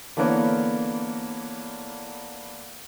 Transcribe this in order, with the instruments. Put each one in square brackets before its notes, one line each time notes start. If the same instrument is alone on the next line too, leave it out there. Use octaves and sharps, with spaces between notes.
[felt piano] D3 E3 A#3 B3 C#5